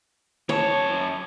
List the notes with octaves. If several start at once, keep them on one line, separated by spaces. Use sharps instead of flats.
F#2 C#5 A5